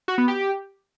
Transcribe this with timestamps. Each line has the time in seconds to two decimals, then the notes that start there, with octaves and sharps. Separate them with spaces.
0.08 F#4
0.18 B3
0.28 G4